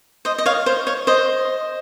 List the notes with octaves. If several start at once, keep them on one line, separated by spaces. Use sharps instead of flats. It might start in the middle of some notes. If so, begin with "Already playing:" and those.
C5 D#5
D#5
C#5 F5
C5
C#5
C5 D#5